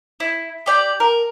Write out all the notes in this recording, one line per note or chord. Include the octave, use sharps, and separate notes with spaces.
E4
G4 D5 G5
A#4